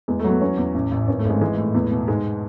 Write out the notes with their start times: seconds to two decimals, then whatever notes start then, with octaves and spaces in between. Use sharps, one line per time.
0.08 E2 G#3
0.19 F#3 A3
0.30 B3
0.41 E2 C#4
0.58 E2
0.74 A1
0.91 A1
1.08 G#1 C#4
1.19 A3
1.24 G#1
1.30 G#3
1.41 E3 G#3
1.58 A2
1.75 E2
1.91 B2
2.08 G#2 G#3